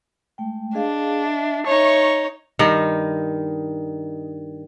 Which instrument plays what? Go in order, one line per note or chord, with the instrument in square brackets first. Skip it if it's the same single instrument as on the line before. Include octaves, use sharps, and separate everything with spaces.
[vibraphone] G#3 A3 G5
[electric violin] D4 [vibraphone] G#4 D#5 F5
[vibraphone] D#5 E5
[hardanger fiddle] D#4 C#5 [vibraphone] E5 [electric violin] C#6
[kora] G2 D#3 D#4